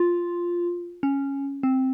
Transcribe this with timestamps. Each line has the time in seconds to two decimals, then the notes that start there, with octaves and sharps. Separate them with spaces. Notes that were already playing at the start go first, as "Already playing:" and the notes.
Already playing: F4
1.03 C#4
1.63 C4